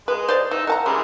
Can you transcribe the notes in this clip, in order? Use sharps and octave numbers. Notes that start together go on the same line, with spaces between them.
G#3 B4
C5 D5
E3 D#4 E6
A#4 F#5 A5 A#5
E3 G3 G#3 C#4